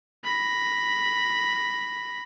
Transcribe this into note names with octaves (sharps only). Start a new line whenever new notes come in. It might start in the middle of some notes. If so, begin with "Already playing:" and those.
B5 A#6